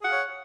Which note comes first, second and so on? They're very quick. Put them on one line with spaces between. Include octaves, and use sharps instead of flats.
G#4 F#5 F5 C#5